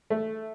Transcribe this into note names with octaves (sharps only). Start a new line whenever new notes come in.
A3